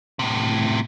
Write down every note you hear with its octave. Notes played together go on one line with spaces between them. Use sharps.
A2 C3